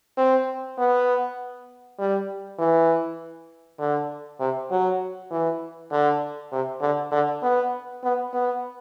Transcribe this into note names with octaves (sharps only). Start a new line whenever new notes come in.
C4
B3
G3
E3
D3
C3
F#3
E3
D3
C3
D3
D3
B3
B3
B3